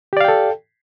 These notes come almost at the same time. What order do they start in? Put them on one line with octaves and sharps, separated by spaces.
G4 D5 F5 G5 A4